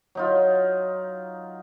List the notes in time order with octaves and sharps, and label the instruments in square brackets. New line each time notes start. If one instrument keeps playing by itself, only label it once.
[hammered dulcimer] F#3 D#4 F4